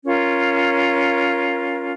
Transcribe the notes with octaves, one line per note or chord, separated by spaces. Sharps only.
C#4 F4 A#4